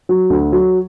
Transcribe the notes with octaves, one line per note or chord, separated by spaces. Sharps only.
F#3
D2
F#3